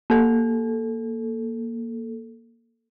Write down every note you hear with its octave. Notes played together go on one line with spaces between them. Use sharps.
A#3 A4